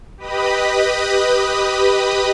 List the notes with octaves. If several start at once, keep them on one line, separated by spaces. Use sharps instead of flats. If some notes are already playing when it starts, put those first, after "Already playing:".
G4 B4 D#5 B5 D#6